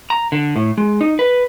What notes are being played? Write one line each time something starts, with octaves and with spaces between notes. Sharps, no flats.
A#5
D3
A2
G#3
D#4
B4